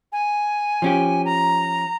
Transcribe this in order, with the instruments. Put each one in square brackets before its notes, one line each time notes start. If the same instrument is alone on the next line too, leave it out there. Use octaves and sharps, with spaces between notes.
[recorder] G#5
[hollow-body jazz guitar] F3 C#4 G4
[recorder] A#5